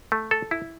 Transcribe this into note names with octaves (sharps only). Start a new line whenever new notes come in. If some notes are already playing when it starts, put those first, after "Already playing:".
A3
A4
E4